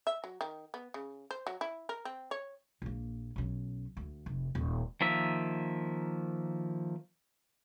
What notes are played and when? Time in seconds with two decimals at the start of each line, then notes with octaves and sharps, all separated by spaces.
0.07 E5
0.24 F#3
0.41 D#3
0.74 B3
0.94 C#3
1.31 C5
1.47 F#3
1.61 E4
1.89 A#4
2.05 C4
2.31 C#5
2.82 A#1 A#3
3.36 B1 C#4
3.97 D2
4.26 F1
4.55 D#1
5.01 D#3 F3 A#3 E5